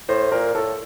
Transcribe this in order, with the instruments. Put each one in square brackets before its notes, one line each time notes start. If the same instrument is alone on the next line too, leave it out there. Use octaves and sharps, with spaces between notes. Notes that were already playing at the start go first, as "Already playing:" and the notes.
[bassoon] A2 [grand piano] C5
[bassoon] A#2 [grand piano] A#4
[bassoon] A2 [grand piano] A4